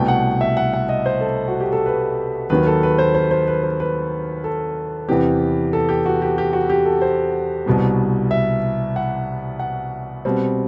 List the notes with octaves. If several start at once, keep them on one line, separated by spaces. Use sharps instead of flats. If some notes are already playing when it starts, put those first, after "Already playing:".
Already playing: C2 B2 A3 G5
F#5
E5
F#5
F#5
D#5
C5
A4
F#4
G4
A4
B4
D#2 D#3 F#3 B4
A4
B4
C5
C5
C5
B4
C5
B4
A4
E2 C3 E3 B3 G4
A4
G4
F#4
G4
G4
F#4
G4
A4
C5
C2 B2 G3
E5
F#5
F#5
B2 G3 C4